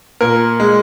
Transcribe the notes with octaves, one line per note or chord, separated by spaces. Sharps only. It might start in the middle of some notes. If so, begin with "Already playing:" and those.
A#2 A#4
G#3